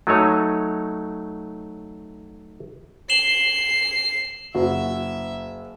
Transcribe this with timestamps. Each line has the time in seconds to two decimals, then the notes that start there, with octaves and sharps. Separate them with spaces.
0.07 F#3 A3 D#4 C#5
3.10 C7 E7 F#7 G7
4.55 F#1 F#4 E5